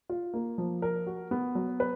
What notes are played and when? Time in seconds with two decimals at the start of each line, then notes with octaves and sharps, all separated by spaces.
0.09 F4
0.34 A#3
0.58 F3
0.82 A#4
1.07 F#4
1.31 B3
1.55 F#3
1.80 B4